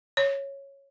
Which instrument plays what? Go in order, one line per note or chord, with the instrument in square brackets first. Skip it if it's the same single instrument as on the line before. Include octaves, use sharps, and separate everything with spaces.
[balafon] C#5